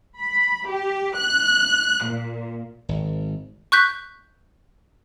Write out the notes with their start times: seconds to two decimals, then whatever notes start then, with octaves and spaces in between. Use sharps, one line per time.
0.19 B5
0.69 G4
1.16 F#6
2.05 A#2
2.89 G#1
3.72 C#6 F#6 G6 B6